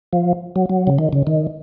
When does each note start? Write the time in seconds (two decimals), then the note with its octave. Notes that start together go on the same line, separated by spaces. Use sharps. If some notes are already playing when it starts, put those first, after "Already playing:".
0.13 F3
0.56 F#3
0.70 F#3
0.87 C#3
0.99 D#3
1.13 C#3
1.27 D#3